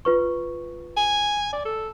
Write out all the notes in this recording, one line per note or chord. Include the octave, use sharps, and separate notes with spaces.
F4 B4 C#6
G#5
D5
A4